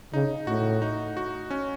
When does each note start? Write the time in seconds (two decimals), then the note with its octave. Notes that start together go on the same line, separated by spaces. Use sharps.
0.13 C#3 D#4
0.47 A2 F#4
0.82 D#4
1.17 F#4
1.50 C#4